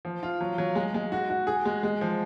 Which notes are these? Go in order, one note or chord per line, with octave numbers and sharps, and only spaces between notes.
F3
F4
F#3
F#3
G#3
G#3
F#4
F#4
G#4
G#3
G#3
F3